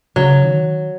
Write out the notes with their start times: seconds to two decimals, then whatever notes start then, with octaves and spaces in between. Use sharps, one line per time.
0.16 C#3 F#3
0.44 D#3